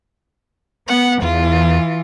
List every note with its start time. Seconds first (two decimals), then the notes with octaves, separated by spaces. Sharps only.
0.88 B3 F#5
1.22 E2 E3 F4